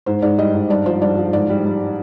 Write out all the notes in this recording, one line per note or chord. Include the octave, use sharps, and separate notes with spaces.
G#2 C5
G#2 D5
G3 D#5
G#2
G2 D5
F3 C5
G2 D5
F3
G#2 D5
G3
G3